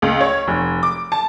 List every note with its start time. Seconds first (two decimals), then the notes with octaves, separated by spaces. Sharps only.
0.02 C#2
0.21 C#5
0.47 F1
0.83 D6
1.12 A5